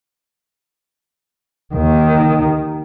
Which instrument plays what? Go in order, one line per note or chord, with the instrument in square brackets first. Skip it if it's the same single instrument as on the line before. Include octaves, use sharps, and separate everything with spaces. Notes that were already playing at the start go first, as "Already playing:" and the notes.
[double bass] D#2 D#3